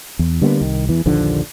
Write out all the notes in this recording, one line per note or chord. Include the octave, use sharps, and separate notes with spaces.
E2
D3 G3 A#3 B3
C2 D#3
E2 E3
A#1 D#2 D3 F3